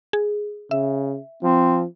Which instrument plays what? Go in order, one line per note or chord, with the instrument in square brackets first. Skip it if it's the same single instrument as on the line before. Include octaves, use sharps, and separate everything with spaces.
[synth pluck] G#4
[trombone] C#3 [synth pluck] E5
[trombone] F3 [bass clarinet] C4